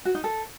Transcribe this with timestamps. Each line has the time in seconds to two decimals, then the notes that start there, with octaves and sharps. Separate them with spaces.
0.05 F#4
0.15 D#4
0.24 A4